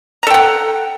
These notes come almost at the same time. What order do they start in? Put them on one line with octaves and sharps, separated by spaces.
A#5 A4 G5 F#5